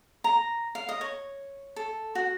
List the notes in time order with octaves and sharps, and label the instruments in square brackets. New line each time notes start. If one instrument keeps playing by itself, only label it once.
[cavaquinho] A#5
F5
D#5
C#5
A4
F#4